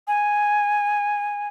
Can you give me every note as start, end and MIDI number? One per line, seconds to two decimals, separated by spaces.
0.08 1.48 80